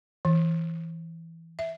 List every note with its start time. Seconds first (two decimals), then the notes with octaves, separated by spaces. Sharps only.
0.25 E3
1.59 E5